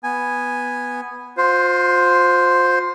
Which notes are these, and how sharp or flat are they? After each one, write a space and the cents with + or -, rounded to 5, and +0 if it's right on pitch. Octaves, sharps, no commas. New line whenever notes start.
B3 +0 G#5 -5
F4 +35 C5 +0